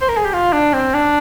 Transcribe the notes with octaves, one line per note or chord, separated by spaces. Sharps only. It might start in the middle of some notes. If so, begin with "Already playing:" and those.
C5
A#4
G#4
G4
F4
D4
C4
D4